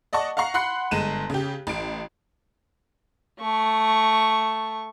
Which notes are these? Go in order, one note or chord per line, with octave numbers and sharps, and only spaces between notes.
D5 D#5 F#5 A5 C#6
F5 F#5 A#5 C#6 C7
F#5 B5 C6 F#6 C7 C#7
G1 G#3 D#7 E7
C#3 G4
A1 D7
A3 C#6